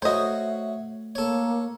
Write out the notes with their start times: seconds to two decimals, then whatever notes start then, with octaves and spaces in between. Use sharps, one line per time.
0.02 A3 F#4 C5 C#5 D#5 E5
1.15 A#3 A4 C#5